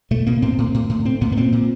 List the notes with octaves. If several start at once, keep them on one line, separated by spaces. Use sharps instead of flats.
B2 A3
B2 A#3
A2 C4
A2
A2
A2
A2 C4
A2 B3
B3
A#2 C4
A#2